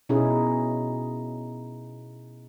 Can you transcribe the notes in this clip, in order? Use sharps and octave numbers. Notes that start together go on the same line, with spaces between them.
B2 C#4 D#4 E4 G#4